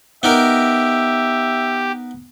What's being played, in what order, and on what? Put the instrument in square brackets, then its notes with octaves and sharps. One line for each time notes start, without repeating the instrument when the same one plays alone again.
[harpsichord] B3 D#4 A#4 [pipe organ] G4 [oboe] E5